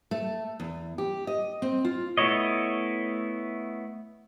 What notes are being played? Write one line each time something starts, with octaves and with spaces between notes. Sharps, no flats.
A3
E2
G4
D#5
C4
F4
A3 B3 E4 C#5 D#5